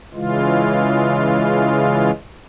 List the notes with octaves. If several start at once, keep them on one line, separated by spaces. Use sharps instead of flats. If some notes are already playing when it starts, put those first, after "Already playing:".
C#3 E3 G#3 F4